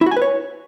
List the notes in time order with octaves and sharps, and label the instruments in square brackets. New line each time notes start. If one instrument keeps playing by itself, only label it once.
[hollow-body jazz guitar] E4
F#4
G#5
B4
C#5